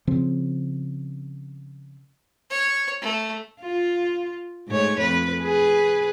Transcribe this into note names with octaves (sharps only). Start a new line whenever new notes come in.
C#3 F3 C4
C#5
A3
F4
G#2 A3 C#5
F2 B4
G#4 B4